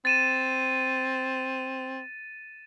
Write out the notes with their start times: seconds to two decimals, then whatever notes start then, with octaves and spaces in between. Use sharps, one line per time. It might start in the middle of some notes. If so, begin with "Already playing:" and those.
0.05 C4 A6 D#7 E7